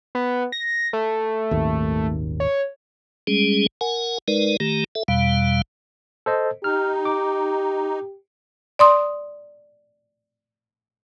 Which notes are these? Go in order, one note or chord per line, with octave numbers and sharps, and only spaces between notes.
B3
A#6
A3
D#1 G#1 D#2
C#5
G3 G#3 C#4 G#4
A#4 F#5 G#5
G#3 D#4 A#4 B4 D5
D#3 A3 G4 A#5
A4 E5
E2 B2 G3 F5
A4 C5 D#5
D#4 G4 F6
D6
D5 C6 D#6